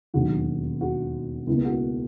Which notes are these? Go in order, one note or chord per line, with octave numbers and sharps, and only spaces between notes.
E1 D#2 D#3 F#3 F#4
F#4
C#2 B2 A#3 E4
F#4